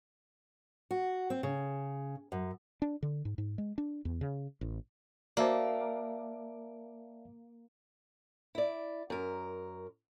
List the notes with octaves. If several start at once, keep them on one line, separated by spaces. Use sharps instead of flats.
F#4
C4
C#3
F#2
D4
D3
G#2
G#2
G#3
D4
E2
C#3
A1
A#3 F#4 C5 D5 E5 A5
E4 D5
F#2 A#4